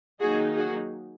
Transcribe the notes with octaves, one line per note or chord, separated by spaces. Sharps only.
D#3 F#3 A#3 D#4 F#4 G#4
F#4 G#4